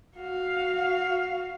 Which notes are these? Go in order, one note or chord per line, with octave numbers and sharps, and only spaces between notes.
F#4 F5